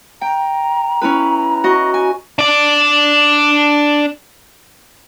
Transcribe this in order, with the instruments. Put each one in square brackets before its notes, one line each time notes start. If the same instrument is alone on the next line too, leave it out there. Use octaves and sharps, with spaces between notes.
[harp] G5 [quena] A#5
[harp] C#4 E4 B4
F#4 D#5
G#5
[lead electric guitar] D4 D5